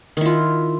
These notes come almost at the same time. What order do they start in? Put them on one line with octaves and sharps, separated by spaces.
D#3 E4 F4